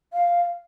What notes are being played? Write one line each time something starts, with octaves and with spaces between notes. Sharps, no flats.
F5